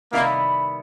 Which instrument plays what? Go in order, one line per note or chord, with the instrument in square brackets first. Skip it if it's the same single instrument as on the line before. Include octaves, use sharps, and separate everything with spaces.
[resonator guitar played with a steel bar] C3 D#3 G3 B3 E4 [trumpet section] A#3